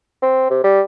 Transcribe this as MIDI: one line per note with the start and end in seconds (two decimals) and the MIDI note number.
0.22 0.47 60
0.50 0.61 48
0.64 0.81 55